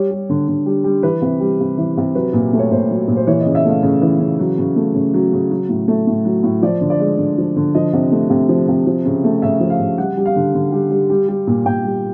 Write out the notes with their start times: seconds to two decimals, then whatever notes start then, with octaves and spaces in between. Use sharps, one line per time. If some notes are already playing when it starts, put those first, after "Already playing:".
Already playing: G3 C#5
0.11 G3
0.30 D3
0.48 D3
0.66 G3
0.84 G3
1.03 E3 B4
1.22 C3
1.40 G3
1.60 C3
1.78 E3
1.97 C3
2.15 F#3 B4
2.33 A#2
2.53 A3
2.59 C#5
2.71 A#2 C5
2.90 F#3
3.08 A#2
3.16 C5
3.27 E3 C#5
3.41 D#5
3.46 C#3
3.55 E5
3.65 A3 F5
3.83 C#3
4.02 E3
4.20 C#3
4.39 F#3
4.58 C#3
4.76 A3
4.94 C#3
5.14 F#3
5.33 C#3
5.51 F#3
5.69 A2
5.88 A3
6.07 A2
6.25 F#3
6.43 A2
6.62 F3 D5
6.81 D3
6.90 D5
7.00 G#3
7.18 D3
7.38 F3
7.56 D3
7.75 F3 D#5
7.93 C3
8.12 A3
8.30 C3
8.49 F3
8.68 C3
8.86 F3
9.05 C#3
9.24 A3
9.42 C#3 E5
9.60 F3
9.70 F5
9.79 C#3
9.98 G3 F#5
10.17 G3
10.25 F5
10.36 D3
10.55 D3
10.72 G3
10.91 G3
11.10 G3
11.28 G3
11.47 A#2
11.66 A#2 G5
11.84 G3